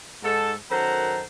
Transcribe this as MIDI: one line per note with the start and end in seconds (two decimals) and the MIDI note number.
0.23 0.53 44
0.23 0.53 69
0.71 1.22 42
0.71 1.22 51
0.71 1.22 69
0.71 1.22 72
0.71 1.22 78
0.71 1.22 82